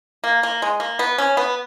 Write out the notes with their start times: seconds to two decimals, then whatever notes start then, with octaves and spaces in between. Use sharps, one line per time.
0.24 A#3
0.43 A#3
0.62 G#3
0.80 A#3
0.99 B3
1.18 C#4
1.37 B3